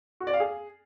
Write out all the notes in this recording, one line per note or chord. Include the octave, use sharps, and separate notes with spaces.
F#4
D5
F5
G#4